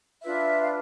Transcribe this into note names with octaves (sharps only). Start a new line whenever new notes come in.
D4 F4 B4 E5
F5